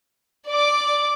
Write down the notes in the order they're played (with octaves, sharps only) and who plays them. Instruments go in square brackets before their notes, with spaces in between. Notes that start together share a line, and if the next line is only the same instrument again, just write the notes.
[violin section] D5 D6